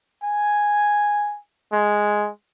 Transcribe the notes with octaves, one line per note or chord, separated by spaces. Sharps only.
G#5
G#3